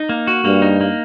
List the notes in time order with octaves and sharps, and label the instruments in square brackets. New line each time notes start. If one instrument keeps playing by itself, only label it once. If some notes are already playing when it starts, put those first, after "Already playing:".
Already playing: [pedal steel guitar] D#4
A#3
F#4
[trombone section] G2 [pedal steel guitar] A#3
[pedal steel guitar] D#4
A#3